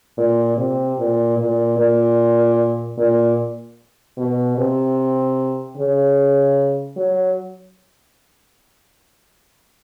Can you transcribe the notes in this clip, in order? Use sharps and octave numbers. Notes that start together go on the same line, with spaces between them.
A#2
C3
A#2
A#2
A#2
A#2
B2
C3
C#3
F#3